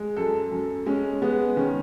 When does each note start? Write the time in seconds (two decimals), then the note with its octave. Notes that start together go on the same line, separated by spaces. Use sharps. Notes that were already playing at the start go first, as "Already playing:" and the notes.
Already playing: G#3
0.16 F#2 A4
0.52 F#2
0.86 G#3 C#4
1.22 G#3 B3
1.57 D#3 C#4